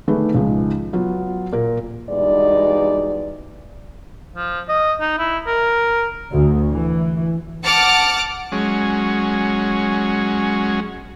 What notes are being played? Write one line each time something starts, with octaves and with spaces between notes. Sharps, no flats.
D3 D#3 A3 D4 G#4 B4
C#2 D#3 F3 G#3
F#3 B3 F4
A#2 A#4
E2 G2 B2 G#3 D#4 D5
F3
D#5
D#4
E4
A#4
D2
E3
F#5 A5 D6 F6 A6 C#7
F#3 G#3 C#4